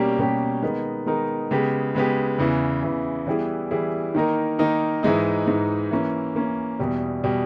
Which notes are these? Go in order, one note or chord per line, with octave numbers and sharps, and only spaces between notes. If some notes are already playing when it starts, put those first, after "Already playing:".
Already playing: B2 G3 A#3 C#4 G4
B2 G3 A#3 C#4 G4
D#3 G#3 B3 D#4 A#4
D#3 G#3 B3 D#4 A#4
C#3 G#3 B3 G4
C#3 G#3 B3 G4
E2 C#3 E3
E2 C#3 E3
E3 G3 B3 E4 G#4
E3 G3 B3 E4 G#4
D#3 A#3 D#4 A#4
D#3 A#3 D#4 A#4
G#2 E3 G#3 D#4
G#2 E3 G#3 D#4
E3 A#3 C#4
E3 A#3 C#4
E2 B2 G3
B2 G3